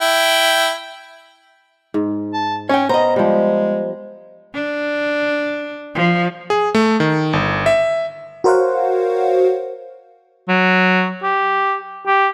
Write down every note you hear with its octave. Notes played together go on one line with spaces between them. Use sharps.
E4 G5
G#2
A5
C#4 C#5 G5
B3 C5 D#5 A#5
F3 G3 G#3
D4
F3
G#4
A3
D#3
G1
E5
F#4 A#4 C5 C#5 F5 F#5
F#3
G4
G4